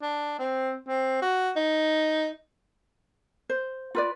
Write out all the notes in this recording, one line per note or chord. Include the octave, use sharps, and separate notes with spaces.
D4
C4
C4
F#4
D#4
C5
F4 B4 D5